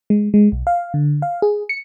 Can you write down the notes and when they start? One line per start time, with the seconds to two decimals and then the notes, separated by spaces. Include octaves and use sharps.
0.10 G#3
0.34 G#3
0.52 B1
0.67 F5
0.94 D3
1.22 F5
1.42 G#4
1.69 C#7